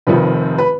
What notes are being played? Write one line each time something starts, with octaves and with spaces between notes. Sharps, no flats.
F1 F2 C3 D#3 B4
B4